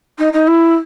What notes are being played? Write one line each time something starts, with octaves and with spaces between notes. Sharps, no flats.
D#4
D#4
E4